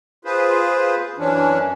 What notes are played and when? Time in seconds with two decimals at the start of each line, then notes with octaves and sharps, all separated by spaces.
0.25 F4 G#4 B4 C5
1.18 F#2 E3 C#4 D4